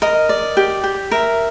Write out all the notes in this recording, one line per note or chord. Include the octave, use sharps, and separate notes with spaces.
A#4 D#5
D5
G4
G4
A#4 E5